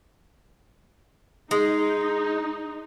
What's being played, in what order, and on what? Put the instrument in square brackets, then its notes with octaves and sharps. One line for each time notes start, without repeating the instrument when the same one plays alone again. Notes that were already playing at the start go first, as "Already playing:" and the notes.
[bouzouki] G#3 [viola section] D#4